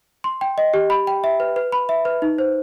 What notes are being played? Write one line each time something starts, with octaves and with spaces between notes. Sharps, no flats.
C6
G5
D#5
G4
B5
G5
E5
B4
B4
B5
E5
B4
D#4
C5